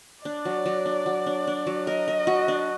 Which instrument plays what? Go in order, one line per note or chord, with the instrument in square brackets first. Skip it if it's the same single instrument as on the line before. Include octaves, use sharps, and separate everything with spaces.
[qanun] D4 [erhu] D5
[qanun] F#3
F#3
D4
F#3
D4
D4
F#3
[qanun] A#4 [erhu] D#5
[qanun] A#4
F#4
D4